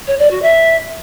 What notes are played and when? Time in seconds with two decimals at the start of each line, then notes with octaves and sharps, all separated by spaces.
0.07 C#5
0.19 D5
0.30 F#4
0.42 E5